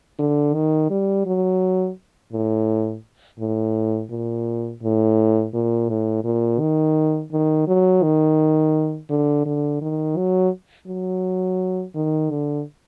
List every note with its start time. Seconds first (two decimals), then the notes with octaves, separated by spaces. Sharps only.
0.19 D3
0.54 D#3
0.90 G3
1.26 F#3
2.33 A2
3.39 A2
4.10 A#2
4.82 A2
5.54 A#2
5.89 A2
6.24 A#2
6.60 D#3
7.32 D#3
7.67 F#3
8.03 D#3
9.10 D3
9.45 D3
9.81 D#3
10.17 F#3
10.88 F#3
11.95 D#3
12.30 D3